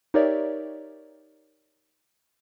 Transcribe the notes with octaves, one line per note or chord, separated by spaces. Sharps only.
D#4 G4 A#4 C#5 D5 E5